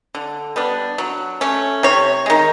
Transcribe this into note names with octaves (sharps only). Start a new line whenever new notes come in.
D3
G3 B3 D4
F#3
A3 C#4
C3 C#5
D#3 G#3